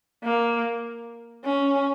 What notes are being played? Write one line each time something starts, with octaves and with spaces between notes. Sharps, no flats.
A#3
C#4